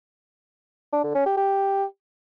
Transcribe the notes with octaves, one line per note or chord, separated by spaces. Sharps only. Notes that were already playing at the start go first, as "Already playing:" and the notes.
D4
D3
C#4
G4
G4